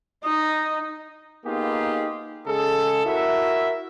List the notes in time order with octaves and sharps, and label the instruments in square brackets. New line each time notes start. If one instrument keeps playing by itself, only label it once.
[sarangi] D#4 [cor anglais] D#5
[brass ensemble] A#3 B3 D#4 F4 G4 G#4
C#3 G#3 G#4 A4
E4 F#4 A#4 E5